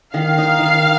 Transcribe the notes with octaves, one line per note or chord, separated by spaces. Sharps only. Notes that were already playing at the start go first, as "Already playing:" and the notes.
D#3 F5
D#4
D#3